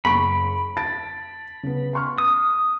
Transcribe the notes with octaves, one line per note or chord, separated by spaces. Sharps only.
F#1 B5 C#6 D7
A5 A6 D7
C#3 B3
C6 C#6 F6
D#6